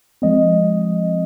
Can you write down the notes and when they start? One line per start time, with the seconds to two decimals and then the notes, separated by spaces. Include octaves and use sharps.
0.22 F3 G#3 C4 D#5